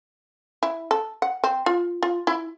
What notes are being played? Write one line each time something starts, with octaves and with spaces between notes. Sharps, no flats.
E4
A4
F#5
C4
F4
F4
E4